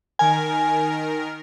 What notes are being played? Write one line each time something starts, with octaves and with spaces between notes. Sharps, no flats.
D#3 A#4 G#5